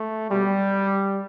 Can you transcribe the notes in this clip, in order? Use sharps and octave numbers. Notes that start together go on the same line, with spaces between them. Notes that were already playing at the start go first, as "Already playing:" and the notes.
Already playing: A3
B2 F#3 G3